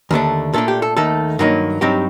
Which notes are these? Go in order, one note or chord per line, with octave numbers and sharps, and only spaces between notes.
D#2 D3 A3 D4
A#2 A3 D4 A4
G4
A4
D#2 D#3 A3 A4
G2 D#3 F#3 A#3 D#4
G2 F#3 C4 D#4 G4